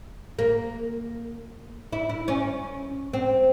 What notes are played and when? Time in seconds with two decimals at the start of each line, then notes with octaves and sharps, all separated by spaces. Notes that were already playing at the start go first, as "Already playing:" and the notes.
0.39 A#3
1.93 E4
2.09 E4
2.28 C#4
3.13 C4